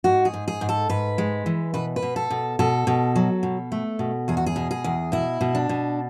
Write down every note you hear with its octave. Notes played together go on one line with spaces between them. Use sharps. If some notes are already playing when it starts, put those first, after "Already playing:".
G#2 F#4
G#4
G#2
G#4
G#2
A4
G#2 B4
G#3
E3
B2 B4
B4
B2
A4
B2
B2 A4
B2
F#3
B2
A3
B2
E2 G#4
F#4
G#4
B2
G#4
E2
B2 E4
B2
D4
B2